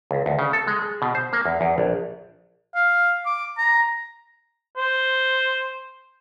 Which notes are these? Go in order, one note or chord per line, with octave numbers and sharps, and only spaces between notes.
C#2
D2
C#3
A4
G#3
G#4
B2
C5
A#3
E2
E2
A#1
F5
D6
A#5
C5